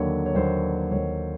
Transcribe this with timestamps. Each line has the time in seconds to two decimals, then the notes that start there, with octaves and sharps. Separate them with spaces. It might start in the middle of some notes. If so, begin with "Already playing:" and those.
Already playing: D#2 D3 F#3 A#3 C#5
0.26 C#5
0.35 D#2 D3 F#3 A#3 C5
0.91 D#2 D3 F#3 A#3 C#5